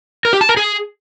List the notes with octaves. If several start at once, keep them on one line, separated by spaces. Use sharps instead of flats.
A#4
G4
A5
A#4
G#4